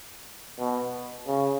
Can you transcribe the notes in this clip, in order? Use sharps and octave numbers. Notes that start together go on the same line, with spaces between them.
B2
C#3